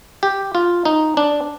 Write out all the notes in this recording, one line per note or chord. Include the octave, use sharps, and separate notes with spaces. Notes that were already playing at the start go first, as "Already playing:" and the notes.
G4
F4
D#4
D4